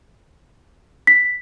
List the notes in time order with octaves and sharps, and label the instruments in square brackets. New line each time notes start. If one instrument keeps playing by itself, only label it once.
[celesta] B6